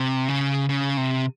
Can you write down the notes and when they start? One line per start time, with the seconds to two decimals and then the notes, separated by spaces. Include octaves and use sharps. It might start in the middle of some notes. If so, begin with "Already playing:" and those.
Already playing: C3
0.28 C#3
0.69 C#3
0.97 C3